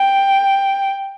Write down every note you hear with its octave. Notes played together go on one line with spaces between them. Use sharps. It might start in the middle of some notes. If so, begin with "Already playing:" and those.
Already playing: G5